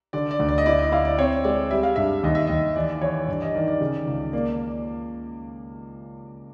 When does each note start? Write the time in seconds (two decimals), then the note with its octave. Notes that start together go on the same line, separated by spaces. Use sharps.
0.13 D3 D5
0.31 D5
0.39 D2
0.49 D5
0.58 D#5
0.66 E4 D5
0.79 D#5
0.92 E4 F5
1.05 D5
1.19 C4 C#5
1.44 G#3 D5
1.71 G3 E5
1.83 F5
1.96 G2 E5
2.23 D#2 D#5
2.35 E5
2.47 D#2 D#5
2.76 E3 D5
3.02 E3 C#5
3.28 G2 D5
3.42 D#5
3.54 D#3 D5
3.68 D5
3.81 C#3
4.07 C#2
4.33 A#3 D5
4.51 D5